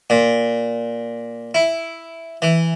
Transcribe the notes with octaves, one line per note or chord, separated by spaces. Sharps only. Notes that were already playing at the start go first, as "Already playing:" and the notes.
A#2
E4
E3